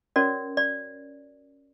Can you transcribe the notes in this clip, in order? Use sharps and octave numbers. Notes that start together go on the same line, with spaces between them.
C#4 F#4 A#4 C#5 D5
D5